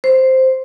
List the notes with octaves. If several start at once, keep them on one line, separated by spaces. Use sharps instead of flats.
C5